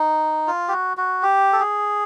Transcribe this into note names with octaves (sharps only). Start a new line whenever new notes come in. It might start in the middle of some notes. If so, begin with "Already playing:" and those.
Already playing: D#4
F4
G4
F#4
F#4
G4
A4
G#4